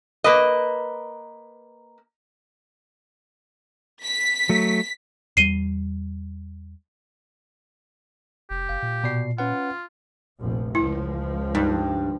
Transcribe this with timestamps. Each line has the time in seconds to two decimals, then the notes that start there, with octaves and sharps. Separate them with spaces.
0.24 A#3 B4 D#5
4.03 B6
4.49 F#3 A3
5.37 E2 G3 C7 D#7 G7
8.50 F1 G4
8.69 F#1 F5
8.82 A#2
9.04 B2 D5 C7
9.38 C#4 F4 B4 F#5
10.39 F1 A#1 F3
10.75 C#2 F3 E4
11.55 G2 D#4